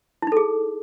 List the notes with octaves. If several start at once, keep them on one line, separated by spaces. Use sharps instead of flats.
D#4 E4 G#4 A4